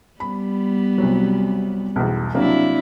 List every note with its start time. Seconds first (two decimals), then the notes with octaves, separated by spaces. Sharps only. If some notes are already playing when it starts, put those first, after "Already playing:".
0.20 G3 B3 B5
0.98 C2 F#3
1.96 B1 E2
2.34 C3 F#3 A#3 D4 E4